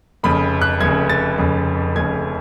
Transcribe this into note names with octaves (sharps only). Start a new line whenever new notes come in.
F1 F2 C#3 B5
F#6
F1 F2 C#3 G#6
A6
F1 F2 C#3
F1 F2 C#3 G#6